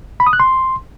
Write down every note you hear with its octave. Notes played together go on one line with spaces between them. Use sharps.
B5
D#6
F#6
C6